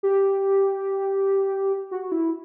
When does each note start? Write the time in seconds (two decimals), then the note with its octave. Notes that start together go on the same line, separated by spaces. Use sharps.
0.03 G4
1.91 F#4
2.12 E4